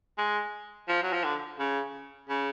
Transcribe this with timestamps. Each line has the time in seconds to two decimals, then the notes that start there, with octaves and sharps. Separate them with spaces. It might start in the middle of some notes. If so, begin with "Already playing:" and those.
0.18 G#3
0.88 F3
1.03 F#3
1.13 F3
1.24 D3
1.59 C#3
2.29 C#3